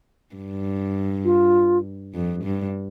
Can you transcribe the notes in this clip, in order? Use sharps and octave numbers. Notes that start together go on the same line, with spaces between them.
G2
F4
F2
G2